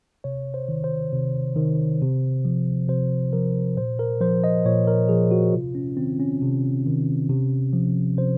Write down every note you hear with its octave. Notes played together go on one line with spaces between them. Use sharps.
C3 C#5
C5
D#3
C5
C3
D#3
C3
F3
C3 C5
F3 A#4
A#2 C5
A#4
F3 C5
D#5
A#2 C#5
A#4
F3 G#4
F#4
C3 F4
C#4
D#3 C4
C#4
C3
D#3
C3
F3
C3 C5